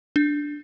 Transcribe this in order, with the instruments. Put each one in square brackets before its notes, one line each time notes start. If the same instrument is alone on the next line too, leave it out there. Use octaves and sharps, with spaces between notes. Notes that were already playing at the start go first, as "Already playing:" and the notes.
[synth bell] D4